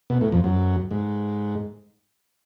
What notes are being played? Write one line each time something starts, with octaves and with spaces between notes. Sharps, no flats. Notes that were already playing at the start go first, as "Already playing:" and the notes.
B2
A2
F2
F#2
G#2